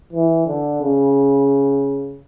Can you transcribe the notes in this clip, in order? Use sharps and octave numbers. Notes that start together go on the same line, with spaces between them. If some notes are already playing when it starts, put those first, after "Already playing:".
E3
D3
C#3